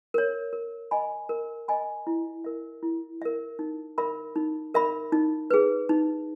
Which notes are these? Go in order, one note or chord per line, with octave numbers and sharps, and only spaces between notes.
A#4 C#5
A#4
D#5 G#5 B5
A#4
D#5 G#5 B5
E4
A#4 E5
E4
A#4 E5
D#4
A#4 E5 B5
D#4
A#4 E5 B5
D#4
G#4 B4
D#4